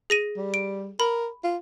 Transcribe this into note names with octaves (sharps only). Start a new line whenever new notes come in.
G#4 A#6 D#7
G3
D7
A#4 B5
F4